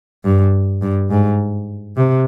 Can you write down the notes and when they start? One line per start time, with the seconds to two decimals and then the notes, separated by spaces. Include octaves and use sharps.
0.25 G2
0.82 G2
1.10 G#2
1.97 C3